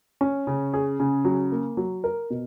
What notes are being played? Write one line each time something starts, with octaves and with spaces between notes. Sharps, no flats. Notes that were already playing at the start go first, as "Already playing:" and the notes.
C#4
C#3
G#4
C#3
F#3
A#3
F#3
A#4
B2